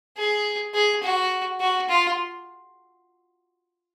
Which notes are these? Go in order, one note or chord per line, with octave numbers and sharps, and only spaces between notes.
G#4
G#4
F#4
F#4
F4